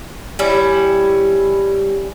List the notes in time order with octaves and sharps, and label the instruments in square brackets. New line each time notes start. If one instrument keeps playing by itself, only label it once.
[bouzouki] G3 C#4 E4